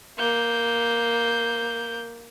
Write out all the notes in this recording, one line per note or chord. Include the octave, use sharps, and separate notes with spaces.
A#3 G6